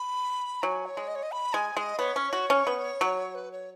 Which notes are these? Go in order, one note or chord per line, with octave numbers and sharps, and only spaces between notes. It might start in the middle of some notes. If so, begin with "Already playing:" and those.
Already playing: B5
F#3 G#5
C#5
G#3
D#5
C#5
D#5
B5
G#3 G#5
G#3 D#5
B3 C#5
C#4
F#4
C#4
B3
F#3
B4
C#5